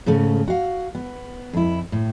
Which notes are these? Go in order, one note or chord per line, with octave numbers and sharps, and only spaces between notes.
G#2 C#3 A3 C#4
F#4 F5
B3
F2 E4
A2